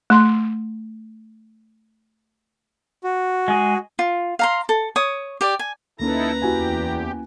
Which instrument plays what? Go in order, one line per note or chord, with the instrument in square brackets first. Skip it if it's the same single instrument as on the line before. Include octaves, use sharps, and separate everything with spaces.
[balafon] A3 C6
[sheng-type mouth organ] F#4
[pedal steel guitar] G#3 G#4
[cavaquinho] F4
F5 A#5 C6
A4
C#5 D#6
G4 D5
G#5
[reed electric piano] D2 A#3 C#4 [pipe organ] D#4 E4 A4 [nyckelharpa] B4 A#5
[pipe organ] E2 G4 [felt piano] E4 F#4 G#5